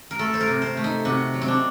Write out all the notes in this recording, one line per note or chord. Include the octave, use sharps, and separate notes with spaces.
A#4
A3 A4
C5
A#4
C3
C5
A3
D#4
C3 F#4
F#3
C4
D4